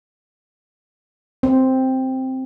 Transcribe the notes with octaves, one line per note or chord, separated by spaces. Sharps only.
C4